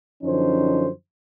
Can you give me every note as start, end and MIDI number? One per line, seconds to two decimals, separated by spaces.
0.23 0.89 42
0.23 0.89 50
0.23 0.89 53
0.23 0.89 61
0.23 0.89 63
0.23 0.89 72